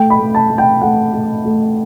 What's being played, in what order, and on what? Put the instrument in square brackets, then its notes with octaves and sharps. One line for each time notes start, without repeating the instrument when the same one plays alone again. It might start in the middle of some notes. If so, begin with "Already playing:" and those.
Already playing: [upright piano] A3 G5
B5
A3
A5
A3
G5
A3 F#5
A3
A3